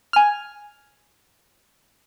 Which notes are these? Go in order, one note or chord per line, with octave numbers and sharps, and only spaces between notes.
G#5 F6